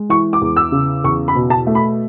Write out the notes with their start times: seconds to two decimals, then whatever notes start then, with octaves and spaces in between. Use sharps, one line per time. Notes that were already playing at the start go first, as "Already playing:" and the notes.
Already playing: G#3
0.09 E3 C#6
0.33 D6
0.41 E2
0.56 E6
0.72 C#3
1.04 E2 C#6
1.28 B5
1.35 B2
1.50 A5
1.67 A3
1.75 B5